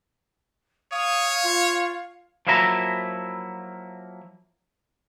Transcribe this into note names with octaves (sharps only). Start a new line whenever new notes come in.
C#5 F5 D#6
F4
F3 F#3 A#3 E4 E5 A#5